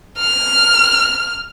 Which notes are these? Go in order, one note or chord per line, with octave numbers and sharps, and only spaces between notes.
F6